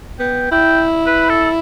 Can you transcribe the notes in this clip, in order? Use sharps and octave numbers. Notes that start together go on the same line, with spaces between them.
B3 G5
E4 G5
B4
A4